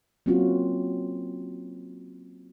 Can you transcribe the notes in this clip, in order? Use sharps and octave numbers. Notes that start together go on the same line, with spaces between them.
F#3 A#3 C4 C#4 F4 F#4